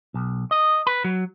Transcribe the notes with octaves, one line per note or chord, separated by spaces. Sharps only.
B1
D#5
B4
F#3